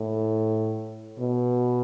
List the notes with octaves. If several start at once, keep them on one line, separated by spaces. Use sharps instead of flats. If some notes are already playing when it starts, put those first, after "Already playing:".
Already playing: A2
B2